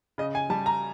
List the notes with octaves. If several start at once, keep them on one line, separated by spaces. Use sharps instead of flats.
C#3 D#5
G#5
G3 A5
A#5